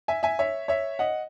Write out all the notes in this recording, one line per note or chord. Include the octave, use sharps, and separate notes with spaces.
E5 G#5
E5 G#5
C#5 E5
C#5 E5
D#5 F#5